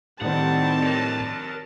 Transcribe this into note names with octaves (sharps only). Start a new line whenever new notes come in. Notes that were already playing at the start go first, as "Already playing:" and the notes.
A2 D#3 G3 C4 F#5 A5
A#4 C#5